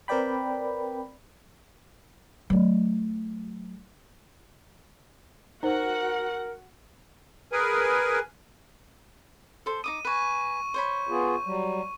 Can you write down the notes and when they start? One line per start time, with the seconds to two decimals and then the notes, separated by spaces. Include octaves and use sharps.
0.08 C4 A#4 B4 D5 G5 B5
2.50 F#3 A3
5.63 D#4 F#4 A#4 C5 F#5
7.52 G#4 A#4 B4 G#5
9.66 A4 C5
9.84 D#4 D6 D#6 D#7
10.05 B4 G#5 C#6 D#7
10.74 C5 C#5 B5
11.09 B3 F4 G#4
11.45 F#3 G3